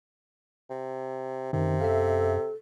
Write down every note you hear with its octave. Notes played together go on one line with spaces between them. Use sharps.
C3
F#2 C3 D#3
A4 E5 F5